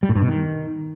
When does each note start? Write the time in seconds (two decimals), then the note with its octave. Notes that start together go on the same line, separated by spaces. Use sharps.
0.03 G3
0.09 A2
0.15 G2
0.22 B2
0.28 D#3